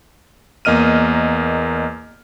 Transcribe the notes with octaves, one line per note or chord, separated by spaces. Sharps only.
E2 A#3 D#5 F6 D#7